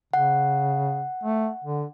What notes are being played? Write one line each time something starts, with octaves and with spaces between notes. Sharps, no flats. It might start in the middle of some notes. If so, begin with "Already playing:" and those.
C#3 F#5
A3
D3